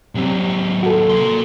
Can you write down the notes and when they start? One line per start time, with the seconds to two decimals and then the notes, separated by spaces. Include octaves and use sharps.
0.15 C3 F#3 G3 C4
0.83 F#4 A4
1.10 A#3 C6